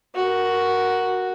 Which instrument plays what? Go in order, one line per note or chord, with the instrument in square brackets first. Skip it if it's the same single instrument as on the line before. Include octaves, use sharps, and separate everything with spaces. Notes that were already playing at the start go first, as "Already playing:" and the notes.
[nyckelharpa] F#4 A#4